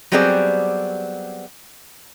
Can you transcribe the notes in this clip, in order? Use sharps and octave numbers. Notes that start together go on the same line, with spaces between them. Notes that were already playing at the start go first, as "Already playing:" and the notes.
F#3 G3 B3 C4 G#4 D5